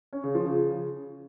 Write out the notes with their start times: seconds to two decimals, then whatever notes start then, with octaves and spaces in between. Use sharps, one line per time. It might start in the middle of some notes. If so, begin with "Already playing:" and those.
0.13 C#4
0.24 C#3
0.35 F3
0.46 C#3